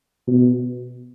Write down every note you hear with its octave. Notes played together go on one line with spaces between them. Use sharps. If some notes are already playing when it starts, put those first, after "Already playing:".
B2